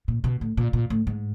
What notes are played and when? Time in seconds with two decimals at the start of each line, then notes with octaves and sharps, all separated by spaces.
0.08 A#2
0.24 B2
0.41 A2
0.57 A#2
0.73 A#2
0.90 A2
1.07 G#2